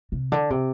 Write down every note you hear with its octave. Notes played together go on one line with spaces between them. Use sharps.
C3
D3
C3